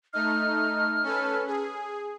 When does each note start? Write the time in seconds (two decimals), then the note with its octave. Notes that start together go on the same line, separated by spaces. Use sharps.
0.13 A3 D#4 F6
1.03 C#4 A4 B4
1.47 G#4